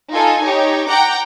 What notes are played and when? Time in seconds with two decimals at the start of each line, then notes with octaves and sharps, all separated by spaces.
0.13 D#4 F4 A4 G#5
0.44 D#4 G4 C#5
0.88 F#5 G5 A#5 D6